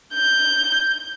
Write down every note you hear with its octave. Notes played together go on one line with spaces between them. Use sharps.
G6